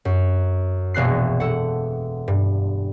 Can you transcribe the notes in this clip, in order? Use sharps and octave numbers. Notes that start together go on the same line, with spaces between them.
F#2
E1 A#1 F#6 C7
A4 F#5
G2